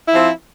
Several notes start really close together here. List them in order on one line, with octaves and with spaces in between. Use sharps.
E4 F3 C4